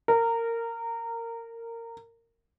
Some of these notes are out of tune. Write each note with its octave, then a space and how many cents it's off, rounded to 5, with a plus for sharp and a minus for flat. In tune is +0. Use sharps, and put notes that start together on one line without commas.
A#4 -20